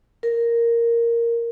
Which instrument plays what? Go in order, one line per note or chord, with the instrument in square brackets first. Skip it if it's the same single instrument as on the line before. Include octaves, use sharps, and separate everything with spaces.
[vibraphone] A#4